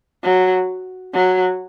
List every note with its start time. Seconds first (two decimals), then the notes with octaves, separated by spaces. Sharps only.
0.24 F#3
1.14 F#3